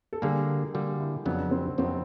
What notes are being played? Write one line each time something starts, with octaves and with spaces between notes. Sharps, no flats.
A4
D3 G3 A#3 G#4
D3 G3 A#3 F#4
E4
F2 C#3 F#3 B3 D4 D#4
C4
F2 C#3 F#3 B3 C4 D#4